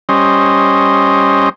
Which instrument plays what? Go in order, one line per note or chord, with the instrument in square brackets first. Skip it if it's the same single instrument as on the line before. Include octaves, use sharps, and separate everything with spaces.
[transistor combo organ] G3 C#4 C5 D#5